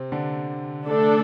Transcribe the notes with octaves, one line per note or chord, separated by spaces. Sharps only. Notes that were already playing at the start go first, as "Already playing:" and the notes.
Already playing: C3 C4
D3 D4
A3 D4 A4